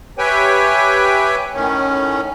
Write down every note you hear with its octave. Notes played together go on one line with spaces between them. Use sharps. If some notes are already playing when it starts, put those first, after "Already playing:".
G4 B4 C#5 E5 G5 G#5
A2 D#3 C#4